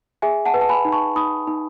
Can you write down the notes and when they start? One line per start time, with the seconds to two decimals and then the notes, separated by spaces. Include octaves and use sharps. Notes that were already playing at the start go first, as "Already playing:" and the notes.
0.22 G#4 E5 G#5
0.45 F#5 A5
0.54 B4
0.61 A5
0.69 G#5 B5
0.85 D#4
0.92 A5 C#6
1.15 D#4 B5 D#6
1.47 D#4